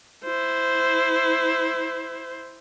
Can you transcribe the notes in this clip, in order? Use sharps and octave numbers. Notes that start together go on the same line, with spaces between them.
E4 C5